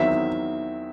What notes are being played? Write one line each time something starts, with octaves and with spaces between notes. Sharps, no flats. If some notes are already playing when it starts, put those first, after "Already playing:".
Already playing: E2 D#3 F#3 C4 E5